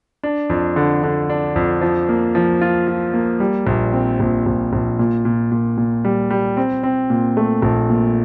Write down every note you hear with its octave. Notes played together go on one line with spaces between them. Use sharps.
D4
F2
D3
D3
D4
F2
F3
A#3
F3
F4
F4
A#3
G3
A#1
C4
A#1
A#1
A#1
A#2
A#2
A#2
A#2
G3
G3
C4
C4
A#2
A3
A#1
A#2